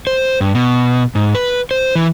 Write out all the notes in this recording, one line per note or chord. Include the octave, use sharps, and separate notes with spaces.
C5
G2
B2
G#2
B4
C5
E3